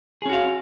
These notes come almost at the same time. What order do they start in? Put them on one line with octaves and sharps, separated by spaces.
G#4 C#4 F#4 F5